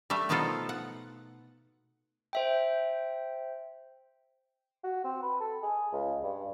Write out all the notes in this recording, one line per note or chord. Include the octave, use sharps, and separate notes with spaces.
G3 A3 E5
B2 F3 B3 D#4 F4 A4
F#5
C5 E5 G5
F#4
C4
B4
A4
G#4
C#2
G2